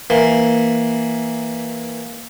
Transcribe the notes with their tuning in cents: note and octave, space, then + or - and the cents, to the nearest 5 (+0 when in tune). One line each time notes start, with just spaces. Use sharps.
E3 +0 A#3 +0